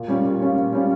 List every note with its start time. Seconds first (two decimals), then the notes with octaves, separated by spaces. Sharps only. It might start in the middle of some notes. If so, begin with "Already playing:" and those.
Already playing: A#2
0.08 G3 C#4 F4
0.24 A#2
0.40 G3 C#4 F4
0.56 A#2
0.73 G3 C#4 F4